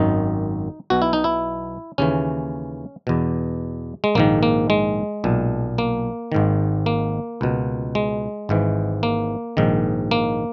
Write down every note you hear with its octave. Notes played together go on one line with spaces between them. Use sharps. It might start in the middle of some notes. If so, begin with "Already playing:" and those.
Already playing: G#1 F#2 D#3 D#4
B1 B2 F#4
E4
D#4
E4
D#2 C#3 E3 C#4
E2 B2
G#3
A#1 G#2 D#3 A#3
A#3
G#3
B1 A#2
A#3
G#1 G#2 D#3
A#3
C#2 B2
G#3
G#1 G#2 E3
A#3
A#1 G#2 D#3
A#3